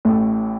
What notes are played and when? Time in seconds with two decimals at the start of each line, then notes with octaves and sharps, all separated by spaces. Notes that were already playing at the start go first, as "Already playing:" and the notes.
0.05 A1 A2 A3